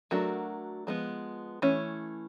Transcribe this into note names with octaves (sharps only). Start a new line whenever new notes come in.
F#3 A3 D4 F#4 A#4
F3 G#3 B3
E3 A3 C#4